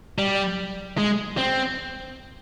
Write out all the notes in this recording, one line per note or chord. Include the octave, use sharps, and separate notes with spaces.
G3
G#3
C4